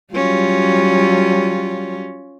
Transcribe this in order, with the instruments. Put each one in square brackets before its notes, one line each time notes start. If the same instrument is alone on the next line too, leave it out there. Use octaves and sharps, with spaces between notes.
[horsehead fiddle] F#3 G3 [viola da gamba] C#4 F4